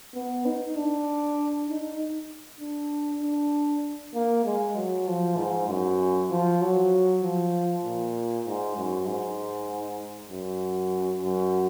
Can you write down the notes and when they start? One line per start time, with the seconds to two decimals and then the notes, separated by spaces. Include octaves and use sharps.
0.15 B3
0.46 D#4
0.76 D4
1.69 D#4
2.60 D4
3.22 D4
4.14 A#3
4.45 G#3
4.76 F#3
5.08 F3
5.37 G#2
5.69 F#2
6.30 F3
6.61 F#3
7.23 F3
7.84 A#2
8.46 G#2
8.77 F#2
9.07 G#2
10.31 F#2
11.22 F#2